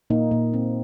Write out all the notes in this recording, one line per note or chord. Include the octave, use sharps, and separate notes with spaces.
A#2 A#3 D#4
A#2 A#3
A#2 C4